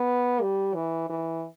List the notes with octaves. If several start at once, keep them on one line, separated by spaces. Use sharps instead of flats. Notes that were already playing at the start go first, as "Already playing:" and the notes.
Already playing: B3
G3
E3
E3